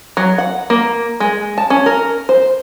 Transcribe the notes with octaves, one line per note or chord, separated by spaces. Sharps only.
F#3
F#5
A#3
G#3
A5
C#4
A#4
C5